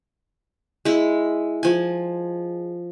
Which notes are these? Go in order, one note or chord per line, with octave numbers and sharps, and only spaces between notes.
G#3 E4
F3 G#5